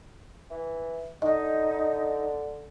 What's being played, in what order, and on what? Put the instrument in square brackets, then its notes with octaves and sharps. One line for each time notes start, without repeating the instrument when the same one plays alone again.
[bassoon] E3
[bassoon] D3 [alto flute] D#4 [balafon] D#5